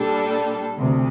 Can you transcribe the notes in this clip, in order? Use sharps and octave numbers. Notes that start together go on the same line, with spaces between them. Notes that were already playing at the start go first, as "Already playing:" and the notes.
Already playing: A#2 G3 D4 A4
D2 C3